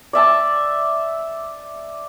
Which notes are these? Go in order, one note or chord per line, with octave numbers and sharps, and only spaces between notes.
D5 E5 A5